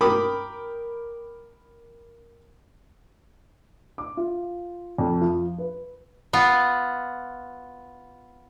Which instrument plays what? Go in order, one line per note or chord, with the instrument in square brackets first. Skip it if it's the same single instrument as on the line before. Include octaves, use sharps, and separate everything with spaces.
[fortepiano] A#4 G5 B5 D6 D#6
[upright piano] D6
F4
F2
F3
B4
[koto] B3 F4